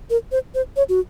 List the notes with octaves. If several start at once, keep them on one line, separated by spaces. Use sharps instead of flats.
A#4
C5
C5
C#5
F#4